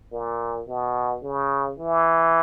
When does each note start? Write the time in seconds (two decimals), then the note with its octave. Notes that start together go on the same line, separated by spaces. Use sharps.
0.12 A#2
0.68 B2
1.23 C#3
1.79 E3